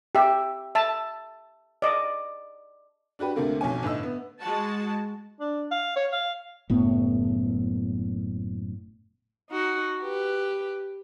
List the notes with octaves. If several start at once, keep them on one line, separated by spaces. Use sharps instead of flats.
G4 E5
E5 A5
D5 D#5
D4 F#4 G4 B4
D2 C3 A3 A#3 C4
B1 F2 C#4 G#5
G1 A2 D#4 E6
B3
G#3 F#4 A5
D4
F5
C#5
F5
F#1 A2 B3
D#4 F#4
G4 B4